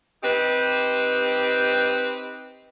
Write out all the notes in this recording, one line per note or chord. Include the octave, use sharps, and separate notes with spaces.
C4 D#4 G4 B4